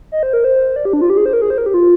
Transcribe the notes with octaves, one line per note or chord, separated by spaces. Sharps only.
D#5
C5
A#4
C5
D5
G4
D4
F4
G4
G#4
C5
A#4
G#4
C5
A#4
G4
F4